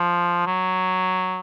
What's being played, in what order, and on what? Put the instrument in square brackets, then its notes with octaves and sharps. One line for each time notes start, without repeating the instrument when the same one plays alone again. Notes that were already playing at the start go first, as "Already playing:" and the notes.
Already playing: [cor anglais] F3
F#3